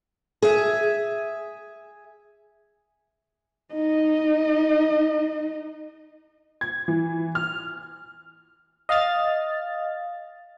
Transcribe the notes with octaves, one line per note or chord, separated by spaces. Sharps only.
G#4 E5
D#4 D#5
G#6
E3
F6
D#5 F5 F6 A6